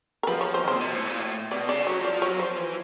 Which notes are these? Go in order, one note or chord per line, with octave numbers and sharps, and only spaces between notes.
A#4
F3 B4
C#5
C5
A#2 C5
B2
A2
A#2
A2
B2 D5
C#3 D5
F#3 C#5
F3
D5
F3
F#3 C#5
F3 C5
E3